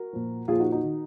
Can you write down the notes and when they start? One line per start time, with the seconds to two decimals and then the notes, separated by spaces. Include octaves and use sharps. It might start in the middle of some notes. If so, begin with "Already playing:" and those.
Already playing: F#4 A#4
0.13 A#2 F3
0.48 A#2 F3 F4 G#4
0.60 D#4 F#4
0.72 D#4 F#4
0.84 D#3